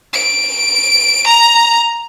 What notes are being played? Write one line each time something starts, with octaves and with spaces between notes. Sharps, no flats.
D7
A#5